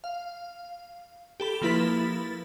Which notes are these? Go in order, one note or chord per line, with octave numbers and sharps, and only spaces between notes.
F5
G4 A4 B5
F3 A#3 E4 B4 B5 A6